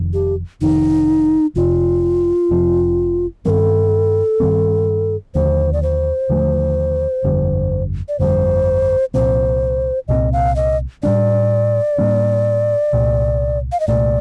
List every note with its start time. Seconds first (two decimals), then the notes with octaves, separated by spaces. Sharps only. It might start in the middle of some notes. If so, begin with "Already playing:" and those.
Already playing: F1 F2 D#3
0.14 G4
0.61 F1 F2 D#3 D#4
1.55 F1 F2 C3 F3 F4
2.51 F1 F2 C3 F3
3.45 G2 D#3 G3 C4 A4 A#4
4.40 G2 D#3 G3 C4
5.35 D#2 D3 F3 A3 C5
5.73 D5
5.83 C5
6.30 D#2 D3 F3 A3
7.24 G1 F2 D3 G3
8.08 D5
8.19 G1 F2 D3 G3 C5
9.14 C2 A#2 F3 C4 C5
10.08 C2 A#2 F3 C4 D#5
10.33 F5
10.56 D#5
11.03 A2 G3 A#3 D4 D5
11.98 A2 G3 A#3 D4
12.93 C2 A#2 A3
13.72 F5
13.80 D#5
13.88 C2 A#2 A3 D5